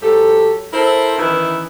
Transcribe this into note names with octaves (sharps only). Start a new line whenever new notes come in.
G#2 F#3 G4 A4
E4 A4 A#4 C5
D#3 E3 B3 C#4 E4